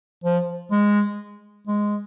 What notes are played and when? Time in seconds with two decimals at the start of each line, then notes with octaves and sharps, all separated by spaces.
0.24 F3
0.71 G#3
1.67 G#3